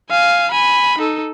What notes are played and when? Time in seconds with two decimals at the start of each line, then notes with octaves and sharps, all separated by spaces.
0.10 F5 G#5
0.51 G#5 B5
0.98 D#4 A4